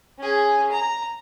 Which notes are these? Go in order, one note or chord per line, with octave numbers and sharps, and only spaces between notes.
C#4 G#4
A#5